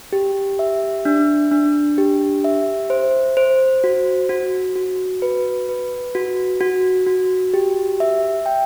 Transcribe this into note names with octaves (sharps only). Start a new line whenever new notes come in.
G4
E5
D4
D4
G4
E5
C5
C5
F#4
F#4
F#4
B4
B4
F#4
F#4
F#4
G4
E5
G5